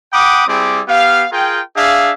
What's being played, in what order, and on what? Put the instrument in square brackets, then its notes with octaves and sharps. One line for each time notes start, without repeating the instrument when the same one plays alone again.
[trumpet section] F#5 G5 B5 D6 D#6
G3 C4 E4 G#4 D6
B3 G4 F5
F4 G#4 A#4 G5
D4 G#4 E5 F5